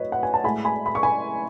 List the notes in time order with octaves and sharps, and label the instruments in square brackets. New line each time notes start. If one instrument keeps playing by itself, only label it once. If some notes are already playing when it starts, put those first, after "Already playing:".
Already playing: [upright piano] A2 F#3 B4 C#5 D#5
F#5
G#5
A5
A2 G#3 G#5 B5
G#5 B5
B5
C#6
G#5 B5